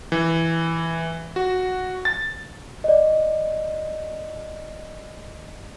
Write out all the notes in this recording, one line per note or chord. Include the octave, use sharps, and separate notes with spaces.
E3
F#4
A6
D5 D#5